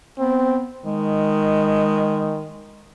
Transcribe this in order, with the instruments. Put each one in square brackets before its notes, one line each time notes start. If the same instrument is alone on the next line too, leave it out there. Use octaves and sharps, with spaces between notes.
[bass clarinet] B3 [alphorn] C4
[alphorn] D#3 [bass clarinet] G#3